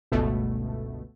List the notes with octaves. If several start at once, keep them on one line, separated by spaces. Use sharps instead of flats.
G1 C#2 B2 A3